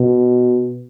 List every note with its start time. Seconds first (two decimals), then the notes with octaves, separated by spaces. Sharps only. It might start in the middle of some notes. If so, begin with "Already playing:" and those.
Already playing: B2